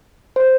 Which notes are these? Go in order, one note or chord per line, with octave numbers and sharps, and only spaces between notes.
C5